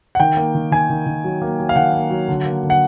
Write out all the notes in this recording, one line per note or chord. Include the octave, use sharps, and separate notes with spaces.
F#5
D#3 G5
A#3
D#3
D#3 G#5
D#3
D#3
F#3
A#3
F#3
F5
D#3 F#5
A#3
F#3
D3
A#3
D3
F#5